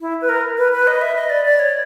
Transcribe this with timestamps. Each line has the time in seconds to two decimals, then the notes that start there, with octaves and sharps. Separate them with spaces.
0.01 E4
0.21 B4
0.29 A#4
0.58 B4
0.72 B4
0.87 D#5
1.02 E5
1.16 D#5
1.30 D5
1.45 D5
1.59 C#5